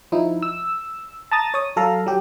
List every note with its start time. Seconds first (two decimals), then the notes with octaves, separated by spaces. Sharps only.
0.12 F3 D#4 E4
0.43 E6
1.31 A5 A#5 D#6 A6
1.54 C#5 D#6
1.76 F#3 A4 F5 A#5
2.06 F#3 G4